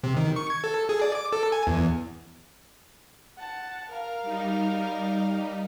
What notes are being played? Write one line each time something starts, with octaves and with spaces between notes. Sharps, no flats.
C3
D#3
C#6
G#6
A4
G#4
D5
D6
A4
G#5
E2
F#5 A5
A#4 F5
G3 D#4